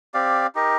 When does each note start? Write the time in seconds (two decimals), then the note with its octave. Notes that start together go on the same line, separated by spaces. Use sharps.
0.14 C4 G4 D5 F5
0.55 D#4 G4 A#4 D#5